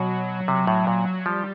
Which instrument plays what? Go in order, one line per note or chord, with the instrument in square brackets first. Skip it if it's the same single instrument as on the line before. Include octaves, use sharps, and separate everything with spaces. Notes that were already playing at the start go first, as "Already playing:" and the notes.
Already playing: [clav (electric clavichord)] B2 [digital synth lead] F#3
[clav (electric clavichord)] C3
A2
A#2
[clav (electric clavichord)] F3 [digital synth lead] G3